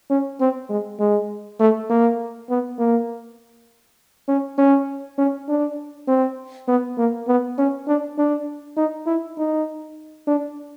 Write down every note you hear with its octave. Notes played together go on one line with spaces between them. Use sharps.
C#4
C4
G#3
G#3
A3
A#3
B3
A#3
C#4
C#4
C#4
D4
C4
B3
A#3
B3
C#4
D4
D4
D#4
E4
D#4
D4